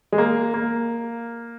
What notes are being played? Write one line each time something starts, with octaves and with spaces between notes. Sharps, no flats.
G#3
A#3
A#3